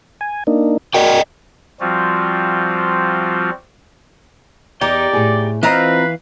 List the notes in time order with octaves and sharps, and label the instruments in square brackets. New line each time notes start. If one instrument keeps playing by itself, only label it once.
[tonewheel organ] G#5
A#3 D4 D#4
[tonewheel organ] F#4 A#4 G#5 [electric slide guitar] D5 D#5 G5
[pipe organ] F3 G3 C4 F4 F#4
[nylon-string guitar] E2 [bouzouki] D#4 G4 [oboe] D5 [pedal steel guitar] G5
[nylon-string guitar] A2 G#4
[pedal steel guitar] E3 F5 [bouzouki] C4 F4 A#5 [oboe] B4 [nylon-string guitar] C5 D#5